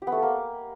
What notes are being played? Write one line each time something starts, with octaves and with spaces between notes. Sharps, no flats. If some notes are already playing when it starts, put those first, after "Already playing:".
G4
B3
A3
A4
A#3